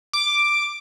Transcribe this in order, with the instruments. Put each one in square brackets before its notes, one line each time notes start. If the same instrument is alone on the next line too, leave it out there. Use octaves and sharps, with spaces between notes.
[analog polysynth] D6